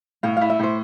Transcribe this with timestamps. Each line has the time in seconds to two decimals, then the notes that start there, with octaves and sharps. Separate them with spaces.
0.23 A2 F5
0.37 E4 F5
0.50 E5
0.59 A2 C5